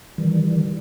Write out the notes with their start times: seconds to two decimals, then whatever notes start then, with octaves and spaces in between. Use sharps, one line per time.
0.18 D#3 E3 G3